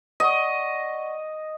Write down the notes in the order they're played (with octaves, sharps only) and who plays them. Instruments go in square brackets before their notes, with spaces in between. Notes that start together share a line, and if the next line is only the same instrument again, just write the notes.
[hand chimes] D5 F#5 C#6 [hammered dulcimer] D#5